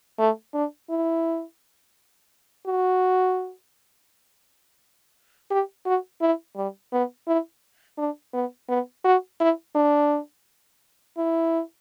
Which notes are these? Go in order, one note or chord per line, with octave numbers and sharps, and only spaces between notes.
A3
D4
E4
F#4
G4
F#4
E4
G3
B3
E4
D4
B3
B3
F#4
E4
D4
E4